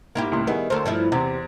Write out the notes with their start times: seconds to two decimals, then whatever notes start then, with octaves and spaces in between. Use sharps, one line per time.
0.15 G#2 A#3 E4 G4
0.32 C#2 A2 C6
0.47 D#3 G3 B3 E4 G#4
0.70 D2 A4 A#4 C5
0.86 G2 F3 E4
1.12 E2 C3 C4